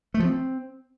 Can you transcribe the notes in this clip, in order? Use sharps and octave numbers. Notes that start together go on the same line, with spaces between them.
A3
F3
C4